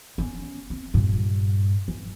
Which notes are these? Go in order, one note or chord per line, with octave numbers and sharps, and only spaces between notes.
B3 C#4
C4
G2 A#2
E3